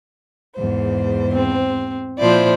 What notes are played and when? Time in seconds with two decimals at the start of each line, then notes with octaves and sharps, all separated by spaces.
0.56 E2 G#2 C5
1.33 C4
2.19 A#2 F3 E4 C5 D5